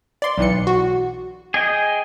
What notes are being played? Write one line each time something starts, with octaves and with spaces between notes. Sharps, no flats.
D5 C6
B1 E3 C#7
F#4
G#4 D#5 G5